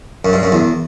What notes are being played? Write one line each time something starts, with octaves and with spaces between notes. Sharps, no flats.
F#2
G2
F#2
E2